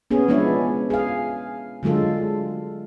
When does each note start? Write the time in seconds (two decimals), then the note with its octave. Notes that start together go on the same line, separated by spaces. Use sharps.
0.11 B3 C#4 G#4
0.28 F3 G#3 B3 D4 E4 C#5
0.90 G#4 F5
1.83 D3 F#3 G#3 F4 A4